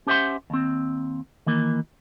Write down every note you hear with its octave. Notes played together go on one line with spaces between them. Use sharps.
C#4 G4 C5 E5 F#5 C6
D#2 C4
D#3 E3 A#3